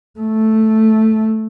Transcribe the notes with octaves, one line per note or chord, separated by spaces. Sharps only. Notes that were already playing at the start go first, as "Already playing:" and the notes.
A3